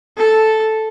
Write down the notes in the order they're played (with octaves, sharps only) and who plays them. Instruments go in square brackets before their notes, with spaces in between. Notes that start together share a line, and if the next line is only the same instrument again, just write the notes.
[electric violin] A4